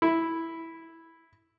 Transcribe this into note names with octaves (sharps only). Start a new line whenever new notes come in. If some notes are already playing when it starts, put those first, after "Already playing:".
E4